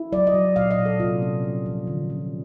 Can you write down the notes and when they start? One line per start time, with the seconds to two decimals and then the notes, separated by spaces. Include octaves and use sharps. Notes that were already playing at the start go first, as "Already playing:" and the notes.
Already playing: E4
0.12 F#3 D5
0.27 D#5
0.34 F#3
0.56 A#2 F5
0.71 D#5
0.79 A#2
0.85 A4
1.00 C3 F4
1.22 C#4
1.44 F3
1.66 F3
1.87 D3
2.10 C#4